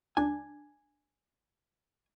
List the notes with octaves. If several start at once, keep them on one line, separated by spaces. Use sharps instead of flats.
C#2 D4 G#5